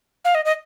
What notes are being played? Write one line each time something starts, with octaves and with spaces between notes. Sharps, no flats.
F5
D#5
D#5